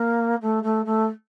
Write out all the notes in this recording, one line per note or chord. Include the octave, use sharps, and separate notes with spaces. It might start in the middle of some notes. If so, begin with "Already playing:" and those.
Already playing: A#3
A3
A3
A3